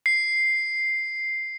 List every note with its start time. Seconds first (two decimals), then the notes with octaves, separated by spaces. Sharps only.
0.06 C7